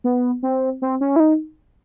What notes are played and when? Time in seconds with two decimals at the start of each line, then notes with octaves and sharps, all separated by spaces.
0.04 B3
0.43 C4
0.82 C4
1.01 C#4
1.16 E4
1.20 D#4